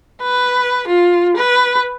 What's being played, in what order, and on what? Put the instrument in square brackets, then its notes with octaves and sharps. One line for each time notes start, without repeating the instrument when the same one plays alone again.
[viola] B4
F4
B4